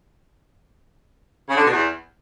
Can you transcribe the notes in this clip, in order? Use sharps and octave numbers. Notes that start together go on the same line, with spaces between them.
C#3
D3
B2
E2